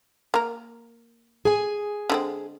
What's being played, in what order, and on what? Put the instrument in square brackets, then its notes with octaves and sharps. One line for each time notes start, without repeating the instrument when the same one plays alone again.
[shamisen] A#3 A#4
[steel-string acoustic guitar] G#4 G#5
[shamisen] D3 G#3 C4